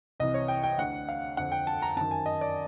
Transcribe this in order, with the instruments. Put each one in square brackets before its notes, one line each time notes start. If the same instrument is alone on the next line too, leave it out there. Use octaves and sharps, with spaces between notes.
[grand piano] C2 C3 E3 D#5
C#5
G5
G5
D2 D3 F#5
F5
F2 D3 F#5
G5
A5
A#5
F#2 D#3 A5
G#5
D#5
D5